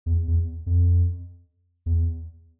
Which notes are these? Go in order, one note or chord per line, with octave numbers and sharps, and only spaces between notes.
E2
E2
F2
E2